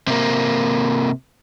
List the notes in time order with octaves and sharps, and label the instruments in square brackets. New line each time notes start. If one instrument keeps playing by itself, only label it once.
[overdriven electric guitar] C3 A#3